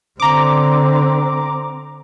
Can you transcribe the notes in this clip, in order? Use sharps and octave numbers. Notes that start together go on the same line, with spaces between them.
D3 C4 A#5 D6